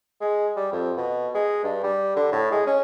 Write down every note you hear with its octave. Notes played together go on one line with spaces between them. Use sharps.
G#3
G3
F2
B2
G#3
G2
G3
D3
A2
G#3
C#4